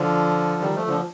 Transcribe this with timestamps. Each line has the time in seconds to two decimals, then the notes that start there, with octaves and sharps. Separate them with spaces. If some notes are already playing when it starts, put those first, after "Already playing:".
Already playing: D3 F3
0.62 D#3 G3
0.75 F3 A3
0.87 D3 F3